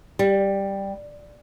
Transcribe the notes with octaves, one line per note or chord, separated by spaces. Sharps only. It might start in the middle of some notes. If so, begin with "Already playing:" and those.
G3